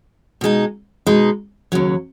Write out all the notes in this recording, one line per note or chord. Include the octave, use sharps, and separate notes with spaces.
B2 G#3 D#4
B2 G#3 D#4
D#2 C#3 F#3